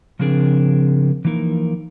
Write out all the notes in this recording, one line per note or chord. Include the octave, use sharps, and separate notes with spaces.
C#3 F3 C4 D4 G#4 A#4
E3 F3 A#3 D#4 A#4